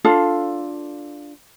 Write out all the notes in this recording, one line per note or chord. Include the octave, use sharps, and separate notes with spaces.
D4 F4 A4 F5